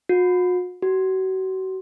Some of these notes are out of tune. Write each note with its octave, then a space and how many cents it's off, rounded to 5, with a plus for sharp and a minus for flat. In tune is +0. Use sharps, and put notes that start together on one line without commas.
F#4 -45
F#4 +35